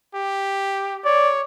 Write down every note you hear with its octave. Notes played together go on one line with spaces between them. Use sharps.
G4
C#5 D5